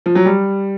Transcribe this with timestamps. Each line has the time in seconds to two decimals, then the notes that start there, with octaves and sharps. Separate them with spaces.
0.06 F3
0.15 F#3
0.26 G3